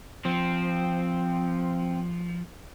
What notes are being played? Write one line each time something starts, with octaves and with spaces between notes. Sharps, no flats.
F3 C4